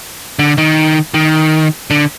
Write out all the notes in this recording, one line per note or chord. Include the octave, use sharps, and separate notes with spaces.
D3
D#3
D#3
D3